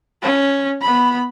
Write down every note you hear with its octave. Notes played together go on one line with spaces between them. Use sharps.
C#4
B3 B5